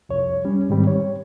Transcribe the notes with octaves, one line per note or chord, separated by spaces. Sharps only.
C2 F2 C#5
G3 C#4
G#2 D#3 G3 C4
C#5